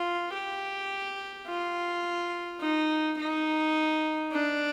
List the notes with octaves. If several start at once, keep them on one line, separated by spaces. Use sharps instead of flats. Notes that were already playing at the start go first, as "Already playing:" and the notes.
Already playing: F4
G4
F4
D#4
D#4
D4